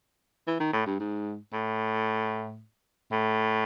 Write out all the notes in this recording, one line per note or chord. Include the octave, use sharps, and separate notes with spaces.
E3
D#3
A2
G2
G#2
A2
A2